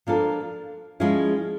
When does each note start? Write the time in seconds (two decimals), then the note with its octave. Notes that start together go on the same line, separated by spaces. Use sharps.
0.07 F3 A#3 D4 F4 A4
1.00 F3 G#3 C#4 E4 G#4